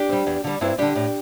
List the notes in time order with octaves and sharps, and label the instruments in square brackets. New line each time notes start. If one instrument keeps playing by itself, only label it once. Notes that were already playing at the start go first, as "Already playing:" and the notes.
Already playing: [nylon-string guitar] D4 G4
G3 C4
E2
D3 G3
G2 C4 E4
D3 G3 D4 G4
A2